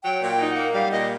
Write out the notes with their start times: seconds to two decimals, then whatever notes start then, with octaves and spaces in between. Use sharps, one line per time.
0.03 F#3 G5
0.21 A#2
0.27 G5
0.39 D#4
0.50 F#5
0.56 A#3
0.73 G3 F5
0.91 A#2 D#5